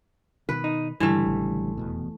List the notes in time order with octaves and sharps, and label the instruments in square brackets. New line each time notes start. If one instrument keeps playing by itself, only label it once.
[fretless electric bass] B2 D#3 [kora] B4
[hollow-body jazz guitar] D#4
[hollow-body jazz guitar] C#2 D3 G3 [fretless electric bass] G2 [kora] E3 A3
[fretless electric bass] A1
F1 E2 B2